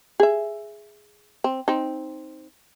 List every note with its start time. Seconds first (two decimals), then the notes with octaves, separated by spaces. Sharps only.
0.20 G#4 E5
1.44 C4
1.68 C4 D#4